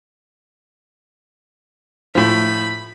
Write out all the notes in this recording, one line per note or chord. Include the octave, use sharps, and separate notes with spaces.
A2 F3 B5